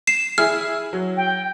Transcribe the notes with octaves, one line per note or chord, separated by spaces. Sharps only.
C7 E7
E4 G#4 F6
F#3
G5